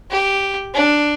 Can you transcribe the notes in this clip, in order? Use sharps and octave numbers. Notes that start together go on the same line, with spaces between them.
G4
D4